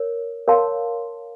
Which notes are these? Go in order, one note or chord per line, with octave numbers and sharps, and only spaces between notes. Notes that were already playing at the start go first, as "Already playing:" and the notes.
Already playing: A#4 C#5
A#4 C#5 F5 A5 C6